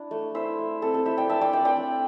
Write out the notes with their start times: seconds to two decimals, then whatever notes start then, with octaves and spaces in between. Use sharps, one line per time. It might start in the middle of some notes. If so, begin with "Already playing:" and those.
Already playing: D4 E4
0.11 A3
0.35 E4 C5 E5
0.59 A3
0.82 C4 A4
0.94 A4
1.05 E4 C5 E5
1.18 D5 G5
1.29 D4 E5 A5
1.41 D5 G5
1.53 A3 D5 G5
1.65 D5 G5
1.77 D4